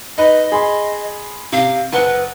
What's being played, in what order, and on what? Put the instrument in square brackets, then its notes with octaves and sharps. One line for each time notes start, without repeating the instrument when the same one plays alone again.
[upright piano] D#4 B4 [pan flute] D#5
[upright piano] G#4 B5 C6
[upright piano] C3 [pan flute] F5
[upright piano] F#1 F#5 G7 [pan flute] B4